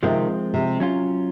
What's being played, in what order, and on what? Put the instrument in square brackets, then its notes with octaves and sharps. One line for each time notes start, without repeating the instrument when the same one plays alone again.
[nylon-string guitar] C3 D#3 [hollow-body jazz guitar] F3 G#3 C4 F4
[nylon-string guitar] C3
[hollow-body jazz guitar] F#3 C#4 F4